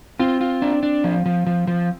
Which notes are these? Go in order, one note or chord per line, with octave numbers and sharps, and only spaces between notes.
C4 F4
F4
D4
D4
F3
F3
F3
F3